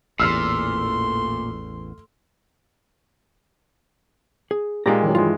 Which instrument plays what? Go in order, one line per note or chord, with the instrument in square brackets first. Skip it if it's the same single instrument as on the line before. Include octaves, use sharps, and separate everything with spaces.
[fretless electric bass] A1 E2 [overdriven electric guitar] A#2 [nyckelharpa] A3 C6 [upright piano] E6 F6 C7
[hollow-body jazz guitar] G#4
[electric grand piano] A#2 G#3 A#3 [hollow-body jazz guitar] D#4 D5 A#5 [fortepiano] G4
[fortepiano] D#3 F#3
[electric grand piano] G2 E3 G#3 [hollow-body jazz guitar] F4